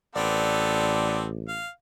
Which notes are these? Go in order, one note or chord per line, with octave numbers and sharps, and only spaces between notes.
A1 B3 C4 A4 D5
F5